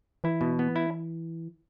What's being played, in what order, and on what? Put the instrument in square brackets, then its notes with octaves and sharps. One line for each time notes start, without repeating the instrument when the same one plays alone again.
[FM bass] E3 [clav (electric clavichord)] E4
[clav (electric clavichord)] B2
B3
E4